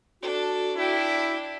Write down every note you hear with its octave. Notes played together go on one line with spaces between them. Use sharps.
D4 F#4 A4
D4 E4 G5